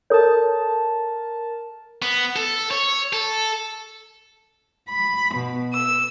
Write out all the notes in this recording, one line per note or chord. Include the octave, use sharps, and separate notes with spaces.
A4 A#4 C#5 A5
B3
A4
C#5
A4
B5
B2
E6